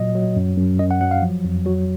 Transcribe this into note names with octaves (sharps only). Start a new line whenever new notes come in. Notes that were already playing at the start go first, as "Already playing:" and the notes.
Already playing: A#2 F#3 D#5
F#3
F#2
F#2
F#2 D#5
F#5
F#3 F#5
F5
F3
F2
F#3 F#4